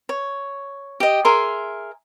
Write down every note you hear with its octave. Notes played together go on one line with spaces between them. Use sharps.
C#5
G4 D#5
G#4 A#4 E5 C6